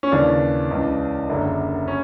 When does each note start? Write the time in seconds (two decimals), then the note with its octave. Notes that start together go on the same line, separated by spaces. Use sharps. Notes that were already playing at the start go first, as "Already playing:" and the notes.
0.03 C#4
0.12 D#2 C#3 E3 D4
0.71 C#2 C#3 E3
1.29 F#1 F#2 D3
1.88 C#4